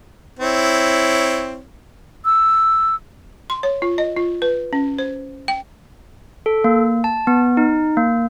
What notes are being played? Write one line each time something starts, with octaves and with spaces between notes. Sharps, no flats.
C4 E4 C#5
E6
C6
C#5
F4
D#5
F4
B4
C#4
C5
G5
A4
A#3
A5
B3
D#4
A#3